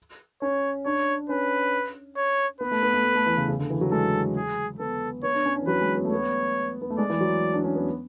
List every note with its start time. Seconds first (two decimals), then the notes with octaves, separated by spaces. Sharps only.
0.42 C#4 C#5
0.86 D4 C#5
1.29 C#4 B4
2.17 C#5
2.61 B3 B4
2.71 A3
2.83 B3
2.94 A3
3.05 A3
3.15 A3
3.27 E3
3.37 C#3
3.48 C#3
3.59 D3
3.70 E3
3.81 F#3
3.92 G#3 A4
4.36 G#4
4.79 B3 A4
5.23 B3 C#5
5.34 D4
5.45 C#4
5.56 C#4
5.62 E3
5.67 F#3 B4
5.81 G#3
5.96 B3
6.05 A3
6.12 B3 C#5
6.82 B3
6.90 A3
6.98 G#3 D5
7.10 E3
7.21 F#3
7.54 D4
7.64 C#4
7.75 B3